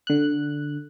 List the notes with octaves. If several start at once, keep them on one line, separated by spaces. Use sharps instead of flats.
D3 F#6